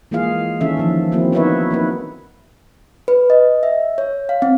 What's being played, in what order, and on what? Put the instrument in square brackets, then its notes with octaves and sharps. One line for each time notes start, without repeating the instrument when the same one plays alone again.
[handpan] E3 G#3 A#3 F4 G#4 F5
D#3 E3 C#4 A4 E5
D#3 F3 C#4
D#3 F#3 A#3 C4 E4
B3 D#4 E4 B4 C#5 E5
A#3 D#4 B4
[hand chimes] B4
D#5
E5
C#5
F5
C4